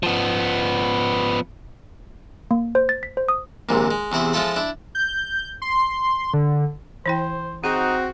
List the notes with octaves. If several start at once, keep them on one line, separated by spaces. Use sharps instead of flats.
F3 B3
A#3
C5
A6
B6
C5
D#6
A#1 D#2 G#2 C3
G#3
E2 C3 E4 G#4 C6
F3 G#3 E4 F4 A4 B5
D4 E4
G6
C6
D3
E3 E4 C5 G5
C4 D#4 F#4 G#4